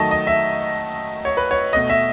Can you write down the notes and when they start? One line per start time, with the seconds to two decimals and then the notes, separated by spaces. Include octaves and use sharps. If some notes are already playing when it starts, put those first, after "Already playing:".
Already playing: D#3 F#3 A3 D#5 A5
0.11 D#5
0.27 E5
1.25 C#5
1.37 B4
1.51 C#5
1.73 B2 A3 D#5
1.90 E5